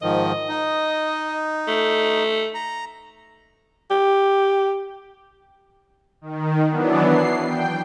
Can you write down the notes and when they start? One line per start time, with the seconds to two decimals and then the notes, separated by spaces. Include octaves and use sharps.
0.02 G#2 D#3 F3 D#5
0.49 D#4
1.68 A3
2.54 A#5
3.91 G4
6.21 D#3
6.70 E3 F#3 B3 D4
7.04 C7
7.45 G5